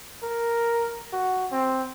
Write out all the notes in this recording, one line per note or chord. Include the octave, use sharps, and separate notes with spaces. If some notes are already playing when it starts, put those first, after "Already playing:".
A#4
F#4
C4